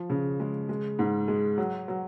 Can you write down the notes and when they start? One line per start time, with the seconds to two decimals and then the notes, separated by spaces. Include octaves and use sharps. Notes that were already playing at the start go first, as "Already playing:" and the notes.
Already playing: F3
0.10 C#3
0.40 G#3
0.69 G#3
0.99 G#2
1.28 G#3
1.58 F#3
1.88 F#3